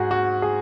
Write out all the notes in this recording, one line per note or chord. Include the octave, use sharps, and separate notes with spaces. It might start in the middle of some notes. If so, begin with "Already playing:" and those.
Already playing: G#2 F#4 G#4
F#4
G#4